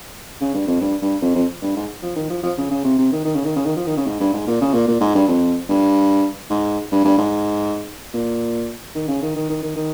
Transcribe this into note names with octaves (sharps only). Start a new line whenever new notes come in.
C#3
G2
F2
G2
G2
F2
F2
G2
G#2
F3
D#3
F3
F3
C#3
C#3
C3
C3
D#3
D#3
C#3
D#3
C#3
D#3
F3
D#3
C#3
G#2
G2
G#2
A#2
C#3
A#2
A#2
G#2
G2
F2
G2
G#2
G2
G2
G#2
A#2
D#3
C#3
D#3
D#3
D#3
D#3
D#3